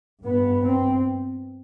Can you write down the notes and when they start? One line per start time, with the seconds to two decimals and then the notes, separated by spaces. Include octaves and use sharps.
0.24 G2 B3
0.65 C4